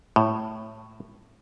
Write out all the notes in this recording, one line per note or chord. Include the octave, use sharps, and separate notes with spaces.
A2